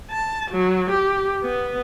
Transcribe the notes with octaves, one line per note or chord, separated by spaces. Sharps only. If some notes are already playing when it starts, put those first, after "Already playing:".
A5
F#3
G4
B3